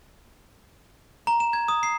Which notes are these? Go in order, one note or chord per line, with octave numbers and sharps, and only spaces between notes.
A#5
E7
G#6
D#6
C7